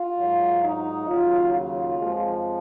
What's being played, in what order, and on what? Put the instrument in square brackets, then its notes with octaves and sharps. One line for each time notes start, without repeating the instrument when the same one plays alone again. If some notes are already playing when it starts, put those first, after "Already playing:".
Already playing: [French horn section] F4
G#2 F#3
D#4
D#2 C#3 F#3 F4
F4
F2 F3 G#3